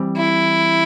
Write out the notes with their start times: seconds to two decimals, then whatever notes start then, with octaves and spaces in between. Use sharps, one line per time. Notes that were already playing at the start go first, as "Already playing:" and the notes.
Already playing: E3 G3 C4
0.17 E4